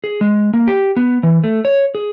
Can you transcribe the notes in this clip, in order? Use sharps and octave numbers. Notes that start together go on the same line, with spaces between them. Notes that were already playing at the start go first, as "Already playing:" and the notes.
G#4
G#3
A#3
G4
B3
E3
A3
C#5
G#4